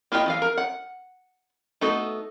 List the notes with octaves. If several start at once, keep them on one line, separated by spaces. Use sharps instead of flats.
A#3 E4 F4 G4 D#5
E3 F3 F5
A#4
F#5
A3 B3 D#4 F#4 A4